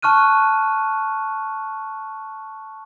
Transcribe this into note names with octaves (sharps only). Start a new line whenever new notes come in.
A5 C#6 F6 F#6 D#7